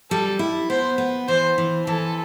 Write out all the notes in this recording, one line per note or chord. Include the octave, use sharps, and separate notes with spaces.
G3 A4
E4
B3 C5
B3
E3 C5
E3
E3 A4